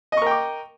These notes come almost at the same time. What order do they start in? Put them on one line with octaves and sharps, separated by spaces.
D#5 C#6 A#4 G5 D6